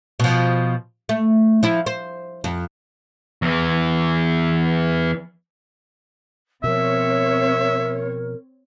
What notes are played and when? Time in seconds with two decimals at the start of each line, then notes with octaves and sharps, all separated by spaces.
0.20 B2 F3
1.09 A3
1.63 F3 E4
1.86 C5
2.44 F2
3.42 E2 E3
6.64 B2 F3 C4 A#4 C#5 E5